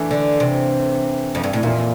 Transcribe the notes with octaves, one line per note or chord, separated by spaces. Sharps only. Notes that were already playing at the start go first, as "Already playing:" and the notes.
Already playing: E3 A3 D4
D3
C3
F2
G2
A2
F2 A#2 E3 A#3 F4